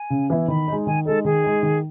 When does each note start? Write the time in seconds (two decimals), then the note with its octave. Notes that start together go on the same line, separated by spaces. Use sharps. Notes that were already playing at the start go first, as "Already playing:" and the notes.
Already playing: G#5
0.10 C#3
0.30 E3 B3 E4
0.48 D#3 B5
0.68 G#3 D#4
0.86 D#3 G#5
1.05 G#3 D#4 A4
1.25 D#3 G#4
1.44 G#3 D#4
1.63 D#3